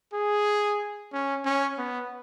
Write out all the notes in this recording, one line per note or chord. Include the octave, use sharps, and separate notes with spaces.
G#4
C#4
C#4
B3